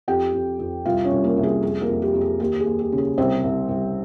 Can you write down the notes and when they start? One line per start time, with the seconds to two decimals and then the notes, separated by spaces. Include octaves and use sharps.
0.08 F2 G4 G5
0.34 F2
0.59 F2
0.85 C2 F4 F5
1.04 C#4 C#5
1.11 C2
1.24 A#3 A#4
1.37 C2
1.43 G#4
1.63 F2 G#4
1.82 A#3 A#4
1.89 F2
2.02 G4
2.14 F2
2.21 G#4
2.40 D#2 G4
2.60 G#4
2.66 D#2
2.79 G4
2.92 C#3
2.98 G#4
3.18 C2 C4 C5
3.44 C2
3.69 C2